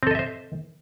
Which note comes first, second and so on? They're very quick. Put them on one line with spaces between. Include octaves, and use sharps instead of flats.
C4 A4 D#5 E5 C5